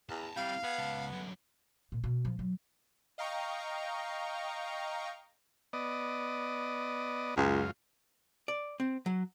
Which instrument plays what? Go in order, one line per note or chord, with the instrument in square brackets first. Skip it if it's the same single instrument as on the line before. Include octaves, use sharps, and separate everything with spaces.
[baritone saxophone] E2 [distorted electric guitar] A5 A#5
[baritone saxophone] G3 [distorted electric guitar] C4 E4 [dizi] F5
[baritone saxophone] B3 [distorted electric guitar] G#4
[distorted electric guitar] C#2 A5
F#2 D3
[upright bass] A#2
B2
F3
F#3
[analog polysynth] D#5 F5 G5 A#5 C#6
[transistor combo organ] B3 D5 D#5
[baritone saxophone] C#2 [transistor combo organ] F#2 F4
[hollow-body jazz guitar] D5
C4
F#3